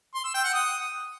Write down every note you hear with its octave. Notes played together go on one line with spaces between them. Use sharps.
C6
E6
G5
F#5
D#6